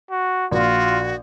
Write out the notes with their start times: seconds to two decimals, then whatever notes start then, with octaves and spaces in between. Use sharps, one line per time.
0.11 F#4
0.52 A#1 F4 F#4